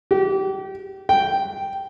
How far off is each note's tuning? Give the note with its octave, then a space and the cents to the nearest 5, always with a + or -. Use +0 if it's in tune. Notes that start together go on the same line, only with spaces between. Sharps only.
G4 -30
G5 -5